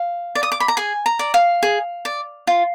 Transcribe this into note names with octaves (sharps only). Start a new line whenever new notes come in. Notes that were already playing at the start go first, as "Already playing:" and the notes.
Already playing: F5
D5
D#6
D6
B5
A#5
G#4 G#5
A#5
D5
F5
G#4
D5
F4